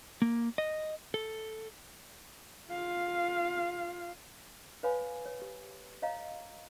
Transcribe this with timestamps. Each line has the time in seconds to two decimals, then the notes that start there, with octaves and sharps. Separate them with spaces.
0.22 A#3
0.58 D#5
1.14 A4
2.70 F4 F5
4.83 B4 C#5 F5 G#5 B5
5.26 C#5
5.42 G4
6.02 C#5 D#5 F5 A#5